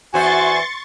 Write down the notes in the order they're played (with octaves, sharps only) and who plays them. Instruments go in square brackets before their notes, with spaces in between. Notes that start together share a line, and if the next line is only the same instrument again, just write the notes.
[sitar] E2 C5 E5 [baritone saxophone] F#4 [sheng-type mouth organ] G#5 [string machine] C6 C#6 A6